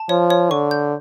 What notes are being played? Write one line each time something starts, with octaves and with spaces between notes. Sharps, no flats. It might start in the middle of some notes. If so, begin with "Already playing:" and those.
Already playing: A5
F3 C#5
C#5
D3 C#6
G6